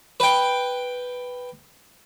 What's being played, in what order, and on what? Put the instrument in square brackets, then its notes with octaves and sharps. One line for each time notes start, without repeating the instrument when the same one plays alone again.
[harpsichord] B4 G5